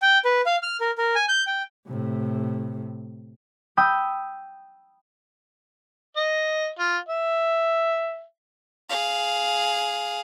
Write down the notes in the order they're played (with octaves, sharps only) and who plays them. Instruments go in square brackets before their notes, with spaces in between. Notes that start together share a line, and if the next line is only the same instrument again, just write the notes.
[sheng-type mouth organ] G5
B4
F5
F6
A#4
A#4
G#5
G6
G5
[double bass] A2 C3
[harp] G5 B5 D#6 E6
[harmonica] D#5
F4
E5
[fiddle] G#4 F5